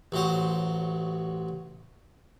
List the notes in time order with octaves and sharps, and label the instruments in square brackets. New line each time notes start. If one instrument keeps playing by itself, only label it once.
[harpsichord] A1 F#3 C5